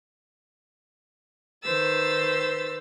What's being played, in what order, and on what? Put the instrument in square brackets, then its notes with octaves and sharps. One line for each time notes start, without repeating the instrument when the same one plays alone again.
[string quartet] D#3 B4 C5 E6 A6